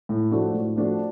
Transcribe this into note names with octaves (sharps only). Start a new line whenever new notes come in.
A2
F3 A3 D4 F#4
A2
F3 A3 D4 F#4